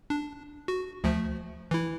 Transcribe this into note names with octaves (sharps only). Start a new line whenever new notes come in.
D4
F#4
D2 F3 A3
E3 E4